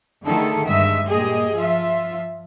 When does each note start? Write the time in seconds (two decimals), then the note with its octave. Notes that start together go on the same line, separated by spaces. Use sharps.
0.24 D3 D#3 A3 E4 G#4 A4
0.66 G2 G#3 D#5 E5
1.08 A#2 G4 G#4 D#5
1.53 F3 F4 E5